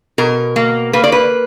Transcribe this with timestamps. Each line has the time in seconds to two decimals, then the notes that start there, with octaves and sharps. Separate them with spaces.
0.18 B2 A#4
0.56 A#3
0.93 A#3 B4
1.04 D5
1.12 B4